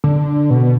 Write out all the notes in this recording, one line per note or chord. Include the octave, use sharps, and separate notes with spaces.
D3
B2